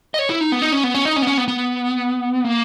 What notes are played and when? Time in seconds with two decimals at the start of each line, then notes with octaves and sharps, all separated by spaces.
0.14 D#5
0.19 C#5
0.30 E4
0.41 D#4
0.52 B3
0.62 D#4
0.72 C#4
0.84 B3
0.94 C#4
1.05 D#4
1.16 C#4
1.22 B3
1.27 C#4
1.38 B3
1.48 B3
2.44 A#3